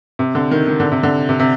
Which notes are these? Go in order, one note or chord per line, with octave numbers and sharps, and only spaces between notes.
C3
D3
D#3
D#3
D3
C3
D3
C3
C3